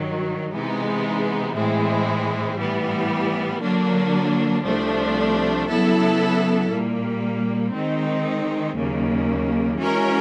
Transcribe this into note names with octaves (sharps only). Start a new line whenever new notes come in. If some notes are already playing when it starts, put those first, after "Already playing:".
Already playing: G2 D#3 F#3
C3 E3 G#3 B3 D#4
A2 E3 G#3 C4 E4
A2 E3 G3 B3
D3 F#3 A#3 D4
C2 C3 F3 A3 D4
C#3 F#3 B3 E4 A4
A#2 G3 A#3
D#3 G#3 C4 D#4
D#2 C#3 F#3 A#3
E3 G#3 C#4 F#4 A#4